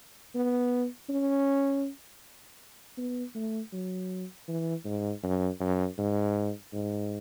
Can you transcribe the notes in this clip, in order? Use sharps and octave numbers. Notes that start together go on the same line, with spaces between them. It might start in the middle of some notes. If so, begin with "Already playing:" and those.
B3
C#4
B3
A3
F#3
E3
G#2
F#2
F#2
G#2
G#2